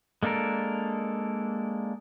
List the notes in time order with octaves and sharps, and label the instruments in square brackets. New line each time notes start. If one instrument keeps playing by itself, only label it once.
[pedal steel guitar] G#3 A#3 D4 A4 A#4